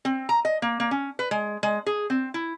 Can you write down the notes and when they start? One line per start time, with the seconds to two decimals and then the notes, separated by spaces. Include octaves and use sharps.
0.05 C4
0.29 A#5
0.45 D#5
0.62 A#3
0.80 A#3
0.91 C#4
1.19 B4
1.31 G#3
1.63 G#3
1.86 G#4
2.10 C4
2.34 E4